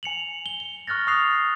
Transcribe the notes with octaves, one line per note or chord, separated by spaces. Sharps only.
G#5 C#7 F7 F#7
G7
G7
C#6 F6 F#6 A6 A#6
C#6 D#6 F#6 C7 F7